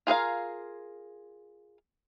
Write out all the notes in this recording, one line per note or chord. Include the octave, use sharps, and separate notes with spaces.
F4 G#4 A#4 F5